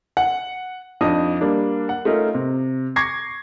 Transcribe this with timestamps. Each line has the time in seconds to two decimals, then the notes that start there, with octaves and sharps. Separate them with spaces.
0.17 F#5
1.01 F2 D4 D#4 D#5 D#6
1.41 G3 A#3 D4
1.89 F#5
2.05 A3 C#4 D#4 F4 A#4
2.34 C3
2.96 C#6 D6 G#6 A#6 C7